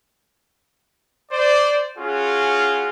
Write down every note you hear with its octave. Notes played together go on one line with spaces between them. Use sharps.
C5 D5
C#4 F4 F#4 G#4